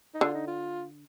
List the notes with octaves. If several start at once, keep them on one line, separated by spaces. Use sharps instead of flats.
D#4
D3 F4
D#4
F4